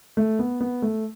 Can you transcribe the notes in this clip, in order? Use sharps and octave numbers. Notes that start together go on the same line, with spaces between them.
A3
B3
B3
A3